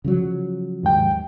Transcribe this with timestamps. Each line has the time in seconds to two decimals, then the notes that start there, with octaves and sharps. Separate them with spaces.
0.04 C#3 F3 F#3
0.83 D#2 G#2 G5